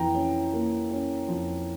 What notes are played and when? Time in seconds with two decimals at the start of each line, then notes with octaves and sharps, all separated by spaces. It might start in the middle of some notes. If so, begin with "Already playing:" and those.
Already playing: F2 E3 G5 A#5
0.15 C#4
0.54 A#3
0.91 C#4
1.28 F2